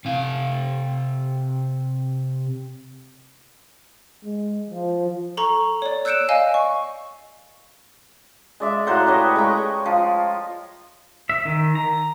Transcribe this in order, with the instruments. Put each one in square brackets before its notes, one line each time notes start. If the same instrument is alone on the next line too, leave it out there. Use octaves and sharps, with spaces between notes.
[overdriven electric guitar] C3 F5
[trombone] G#3
F3
[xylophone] A4 A#5 C#6
C#5 D5
E6 F#6 G6 C#7 D7 E7
D#5 F5 G#5
C#6
[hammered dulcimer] G#3 D5 E5
A2 F#3 C5 F#5
G4 B4 C#5 D#5
G#3 G5 A#5 C#6
F3
[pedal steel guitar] E5
D#3
A#5